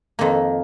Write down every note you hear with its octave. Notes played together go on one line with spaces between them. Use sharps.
F2 D#3 A#3